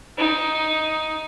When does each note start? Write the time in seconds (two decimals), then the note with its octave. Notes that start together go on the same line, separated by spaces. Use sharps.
0.18 D#4